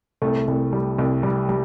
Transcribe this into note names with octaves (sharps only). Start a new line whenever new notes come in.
C2 A3
C2
G3
C2
G3
G3